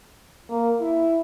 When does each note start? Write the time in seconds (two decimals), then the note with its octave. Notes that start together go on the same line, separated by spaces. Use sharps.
0.49 A#3
0.80 E4